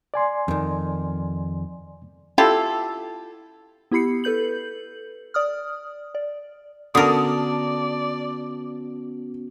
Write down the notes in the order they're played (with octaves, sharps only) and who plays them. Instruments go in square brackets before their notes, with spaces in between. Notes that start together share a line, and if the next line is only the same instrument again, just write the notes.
[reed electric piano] D5 G#5 C6
[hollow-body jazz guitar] F2 D#3
[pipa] E4 F4 G4 A4
[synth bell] B3 E4 G4 B5 C7 C#7
A4 B4 G6 F#7
D5 D#6 F6
D5
[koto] D3 A#4 [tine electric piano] B3 C#4 F#4 [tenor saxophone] D5 [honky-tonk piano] A5 D#6